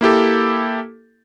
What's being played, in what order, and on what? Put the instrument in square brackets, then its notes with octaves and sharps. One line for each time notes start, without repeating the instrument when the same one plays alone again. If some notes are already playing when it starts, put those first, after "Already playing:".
[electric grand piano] A#3 E4 G4 A4